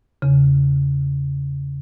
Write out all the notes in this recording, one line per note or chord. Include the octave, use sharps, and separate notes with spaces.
E2 C#3